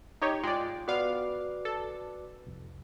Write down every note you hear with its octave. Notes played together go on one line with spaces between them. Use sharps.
D#4 G4 C#5
G#2 G#3 F4 D5 G5
B3 F#4 B4 D5 F5 D6
A4
C2 F2